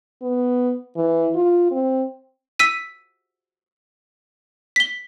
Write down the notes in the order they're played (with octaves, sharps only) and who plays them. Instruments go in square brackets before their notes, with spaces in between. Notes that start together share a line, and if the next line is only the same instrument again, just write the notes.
[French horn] B3
E3
F4
C4
[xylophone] E6 B6 D#7
B6 G7